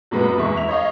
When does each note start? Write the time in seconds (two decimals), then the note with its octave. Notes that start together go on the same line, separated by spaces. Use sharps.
0.11 F#2 A#2 G#3 B3
0.37 E2 G#3 E5 C#6
0.57 E5 F7
0.68 C#5 D#5 F5